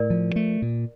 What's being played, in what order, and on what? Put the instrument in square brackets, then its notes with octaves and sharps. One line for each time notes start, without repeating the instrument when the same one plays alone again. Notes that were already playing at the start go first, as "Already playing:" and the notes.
Already playing: [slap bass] A2 [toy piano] A#4 D5
[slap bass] F3
A3
A#2